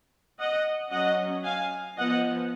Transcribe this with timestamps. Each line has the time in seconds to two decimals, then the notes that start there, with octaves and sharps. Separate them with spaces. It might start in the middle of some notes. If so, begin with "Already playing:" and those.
0.40 D#5 F#5
0.92 F#3 C#4 D#5 F#5
1.45 F5 G#5
1.97 F3 B3 D#5 F#5